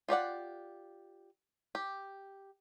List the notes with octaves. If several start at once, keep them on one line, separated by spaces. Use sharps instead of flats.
F4 G4 D5 F#5
G4